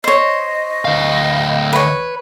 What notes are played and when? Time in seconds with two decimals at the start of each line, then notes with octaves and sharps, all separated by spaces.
0.04 C5 C#5 D#5
0.85 D2 F5
1.73 B4 C#5